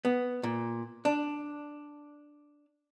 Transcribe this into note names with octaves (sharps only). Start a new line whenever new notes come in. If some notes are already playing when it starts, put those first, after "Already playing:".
B3
A#2
D4